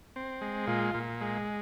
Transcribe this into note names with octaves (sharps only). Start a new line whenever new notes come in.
C4
G#3
A#2 F4
A#2
G#3